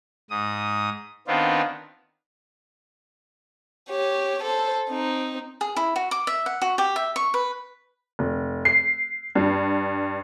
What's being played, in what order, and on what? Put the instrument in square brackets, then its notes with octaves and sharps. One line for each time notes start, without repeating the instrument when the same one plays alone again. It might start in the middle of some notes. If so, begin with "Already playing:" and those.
[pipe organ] G#2 D#6
D#3 B3 C4 D4 F4
[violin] G4 C#5
A4 C5
C4 D#4
[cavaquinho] G#4
E4
F#4
D6
E5
F#5
F#4
G4
E5
C#6
B4
[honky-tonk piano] F1
C7
G2